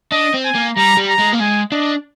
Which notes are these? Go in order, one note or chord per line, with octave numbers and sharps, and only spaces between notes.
D4 D#5
C4
G#5
A#3
G3 A#5
G3
A#5
G#3
A#3
G#3 G#5
D4 D#5